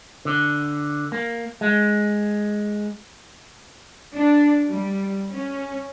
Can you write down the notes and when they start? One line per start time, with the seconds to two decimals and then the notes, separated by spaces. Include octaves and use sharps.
0.25 D3
1.12 A#3
1.61 G#3
4.13 D4
4.67 G3
5.32 C#4